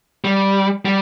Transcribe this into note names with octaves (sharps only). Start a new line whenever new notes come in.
G3
G3